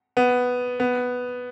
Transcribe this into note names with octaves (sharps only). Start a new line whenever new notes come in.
B3
B3